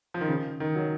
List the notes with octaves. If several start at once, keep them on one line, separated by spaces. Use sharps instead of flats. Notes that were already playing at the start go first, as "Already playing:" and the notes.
F3
D#3
C#3
D#3
F#3